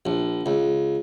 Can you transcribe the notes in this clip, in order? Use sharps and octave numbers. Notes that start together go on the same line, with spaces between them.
A#1
C#2